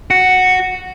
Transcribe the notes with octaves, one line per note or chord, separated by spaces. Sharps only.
F#4